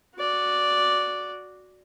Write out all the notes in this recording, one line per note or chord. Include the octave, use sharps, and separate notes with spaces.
F#4 D5